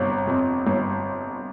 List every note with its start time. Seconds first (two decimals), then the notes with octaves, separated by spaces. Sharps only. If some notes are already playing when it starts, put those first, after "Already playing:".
Already playing: G1 C3
0.27 F2
0.67 G1